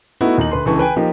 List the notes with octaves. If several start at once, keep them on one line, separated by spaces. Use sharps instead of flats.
A3 B3 D#4 E4 F#4
D#2 D#4 F#7
D2 B4 C6
C#2 D3 E3 A5 C#6
B4 G5 G#5
F3 A#3 D#4 G4